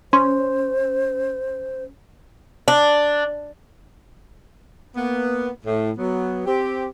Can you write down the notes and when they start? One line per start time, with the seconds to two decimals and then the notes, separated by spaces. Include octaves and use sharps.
0.13 C#4 C5 C6
2.68 D4
4.96 A#3 B3
5.65 A2
5.98 F#3 B3
6.46 C4 G4